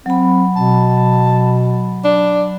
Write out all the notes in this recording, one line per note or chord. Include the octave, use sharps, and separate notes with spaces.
F#3 C4 B5
B2 A5
D4